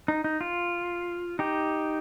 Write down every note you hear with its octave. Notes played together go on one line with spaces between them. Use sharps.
D#4
D#4
F4
D#4 G4